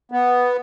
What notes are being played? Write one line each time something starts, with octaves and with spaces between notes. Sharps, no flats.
B3